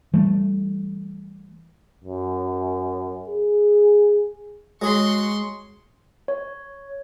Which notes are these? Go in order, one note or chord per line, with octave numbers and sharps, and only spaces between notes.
E3 G3 A3
F#2
G#4
F#3 G#3 G#4 C6 C#6
C#5